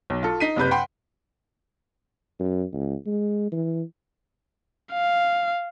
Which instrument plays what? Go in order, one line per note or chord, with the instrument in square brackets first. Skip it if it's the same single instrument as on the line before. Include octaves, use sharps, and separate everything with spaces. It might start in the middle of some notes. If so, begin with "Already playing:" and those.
[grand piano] B1
F4 A4
D#4 B6 C7 D#7
F#1 C3 B4 G6
F#5 G5 B5 C6
[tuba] F#2
C#2
G#3
E3
[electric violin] F5